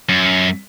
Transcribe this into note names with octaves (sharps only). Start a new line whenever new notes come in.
F#2